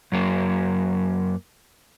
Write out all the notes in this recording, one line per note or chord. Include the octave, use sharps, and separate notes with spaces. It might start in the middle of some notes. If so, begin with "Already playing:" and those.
F#2 F#3 A#3